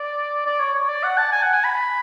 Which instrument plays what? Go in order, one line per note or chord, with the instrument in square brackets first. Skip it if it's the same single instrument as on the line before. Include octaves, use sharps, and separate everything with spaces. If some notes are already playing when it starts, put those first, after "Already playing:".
Already playing: [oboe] D5
D5
C#5
C#5
D5
F#5
A5
G#5
F#5
G#5
B5